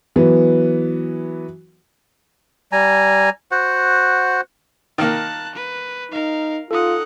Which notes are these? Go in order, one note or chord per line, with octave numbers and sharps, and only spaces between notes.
E3 F#3 B3
G3 G#5 A#5
F#4 C5 F#5
D#3 A#3 A5 F#6
B4
D#4 A#4 F5
D#4 F4 A4 F#5 D#6